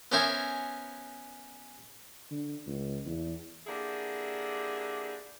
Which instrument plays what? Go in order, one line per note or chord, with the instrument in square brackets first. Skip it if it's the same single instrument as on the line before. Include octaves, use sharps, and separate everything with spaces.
[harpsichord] B3 C#4 A#4 C5 E5 G#5
[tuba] D3
C#2
E2
[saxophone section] D3 A#3 D4 E4 G4 G#4